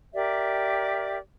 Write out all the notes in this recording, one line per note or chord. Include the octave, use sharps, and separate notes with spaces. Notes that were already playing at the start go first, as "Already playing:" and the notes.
G4 A#4 D5 E5